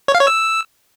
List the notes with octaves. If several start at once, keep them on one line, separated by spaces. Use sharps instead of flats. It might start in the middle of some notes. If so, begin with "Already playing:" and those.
C#5
F5
C#5
E6